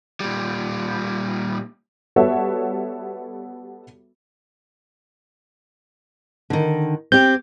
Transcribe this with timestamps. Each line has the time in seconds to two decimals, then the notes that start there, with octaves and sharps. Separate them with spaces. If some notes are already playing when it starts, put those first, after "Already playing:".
0.20 A#2 G3
2.16 G3 B3 F#4 A4 C#5 E5
6.50 D3 D#3
7.12 C4 G4 G6